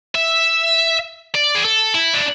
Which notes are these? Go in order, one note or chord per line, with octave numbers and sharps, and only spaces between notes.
E5
D5
G#4
A4
E4
D4